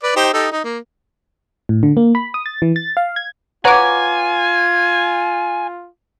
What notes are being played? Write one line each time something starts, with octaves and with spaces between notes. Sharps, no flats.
B4 D5
D#4 G4 C5
D#4 G4 A4
D#4
A#3
A2
D3
A#3
B5
D#6
A6
E3
A6
F5
G#6
F4 B4 C#5 F#5 G#5 A#5 D6